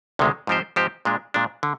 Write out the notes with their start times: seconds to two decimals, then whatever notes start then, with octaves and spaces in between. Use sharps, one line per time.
0.19 D2 C3 D#3 G#3
0.47 G#2 F3 C4 G4 C5
0.76 G#2 F3 C4 G4 C5
1.05 A#2 G#3 D4
1.34 A#2 G#3 D4
1.63 D3